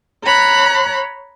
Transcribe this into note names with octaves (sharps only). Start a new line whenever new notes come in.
C#5 A#5 B5 F#6